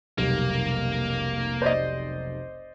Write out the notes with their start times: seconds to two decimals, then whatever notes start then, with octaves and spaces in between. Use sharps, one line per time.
0.18 F1 B1 G3 A#3
1.62 C5 D5 D#5